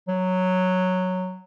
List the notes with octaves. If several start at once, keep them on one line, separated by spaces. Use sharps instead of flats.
F#3